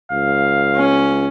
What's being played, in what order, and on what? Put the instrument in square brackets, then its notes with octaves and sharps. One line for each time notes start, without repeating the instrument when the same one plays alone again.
[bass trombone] C#2 [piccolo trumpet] F5
[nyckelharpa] C#4